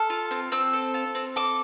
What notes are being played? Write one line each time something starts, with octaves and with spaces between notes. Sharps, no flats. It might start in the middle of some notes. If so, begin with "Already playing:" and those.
Already playing: A4 F6
F4
C4
C4 E6
A4
F4
C4
A4 D6